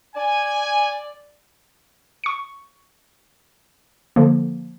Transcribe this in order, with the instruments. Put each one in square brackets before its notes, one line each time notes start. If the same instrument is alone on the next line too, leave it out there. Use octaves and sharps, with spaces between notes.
[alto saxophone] D5 [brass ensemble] G#5
[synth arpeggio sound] C#6 C#7
D3 F3 A#3